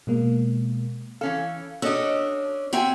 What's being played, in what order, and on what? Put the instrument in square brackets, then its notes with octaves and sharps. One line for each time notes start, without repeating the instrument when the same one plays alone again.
[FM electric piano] B2 G#3 A#3
[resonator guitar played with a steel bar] E3 C#4 A4 [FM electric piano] F5
[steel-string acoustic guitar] C#4 D4 [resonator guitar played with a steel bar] F#4 A4 D#5 [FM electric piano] E6
[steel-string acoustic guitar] C4 F#4 E5 [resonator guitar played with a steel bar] G#5 A#5